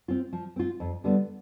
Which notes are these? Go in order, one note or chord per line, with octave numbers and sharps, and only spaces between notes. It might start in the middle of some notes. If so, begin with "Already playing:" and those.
C4 F4
F3
C4 F4
F2
D3 G3 B3